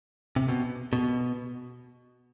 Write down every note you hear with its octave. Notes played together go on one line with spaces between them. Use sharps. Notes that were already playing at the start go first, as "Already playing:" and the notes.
C3
B2
B2